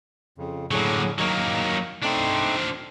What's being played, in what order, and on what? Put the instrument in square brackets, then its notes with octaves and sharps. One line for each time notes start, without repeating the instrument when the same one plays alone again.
[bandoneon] F2 C#3
[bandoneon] A2 D3 G#4 [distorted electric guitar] F#3 A#3
[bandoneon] D#3 D#4 [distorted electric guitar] F#3 A#3
[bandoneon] A3 C4 D#4 [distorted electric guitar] D4 C5